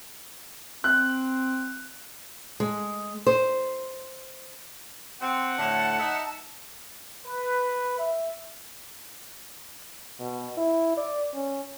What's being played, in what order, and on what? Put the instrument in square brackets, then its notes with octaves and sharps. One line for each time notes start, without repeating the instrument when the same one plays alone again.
[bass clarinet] C4 [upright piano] F#6
[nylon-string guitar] G#3
C5
[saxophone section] C4 [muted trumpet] F#5
[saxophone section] A2 D3 [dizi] A5
[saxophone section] D#4 E5
[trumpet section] B4
E5
[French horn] B2
E4
D5
C#4